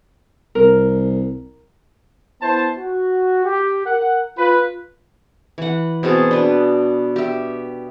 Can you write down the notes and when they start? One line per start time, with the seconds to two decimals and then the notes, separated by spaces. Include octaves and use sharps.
0.55 C2 A#4
2.41 B3 E4 C5 A5
2.78 F#4
3.45 G4
3.86 A#4 F#5
4.37 F4 B4
5.58 E3 F#5
6.03 B2 C4 G#4 A5
6.31 D4 B4
7.16 G4 E5